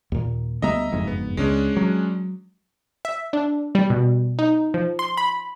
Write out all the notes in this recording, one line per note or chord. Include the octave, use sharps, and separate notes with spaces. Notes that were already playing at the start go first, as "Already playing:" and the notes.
D#2 A#2
D2 G3 B3 D#5 E5 A#5
F#1 F2 G#2
B3
C#2 G#3 C#4 D4
F#3
E5
D4
G3
B2
D#4
F3
C6
B5